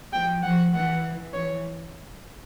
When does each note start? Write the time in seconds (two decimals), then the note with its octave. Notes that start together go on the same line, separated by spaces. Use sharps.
0.13 F3 G5
0.43 F3 F#5
0.74 E3 F#5
1.34 E3 C#5